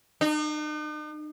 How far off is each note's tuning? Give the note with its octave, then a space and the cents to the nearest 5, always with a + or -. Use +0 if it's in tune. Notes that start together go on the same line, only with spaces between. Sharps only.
D#4 -45